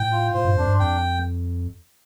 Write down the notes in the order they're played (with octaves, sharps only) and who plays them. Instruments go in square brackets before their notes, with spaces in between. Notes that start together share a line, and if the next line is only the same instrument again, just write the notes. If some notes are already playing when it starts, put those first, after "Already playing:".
Already playing: [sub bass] A2 [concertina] G5
[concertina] F4
[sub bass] A2 [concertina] C5
[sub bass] G2
[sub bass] F2 [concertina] D4
[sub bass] G2
[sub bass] F2 [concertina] G5